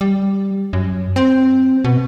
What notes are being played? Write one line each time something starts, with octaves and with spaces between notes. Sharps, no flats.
G3
F#2
C4
B2